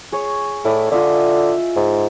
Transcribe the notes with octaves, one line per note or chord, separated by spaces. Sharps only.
G#4 C#5
A2 E4 D5 D#5
D3 F4 D#5 E5
G#2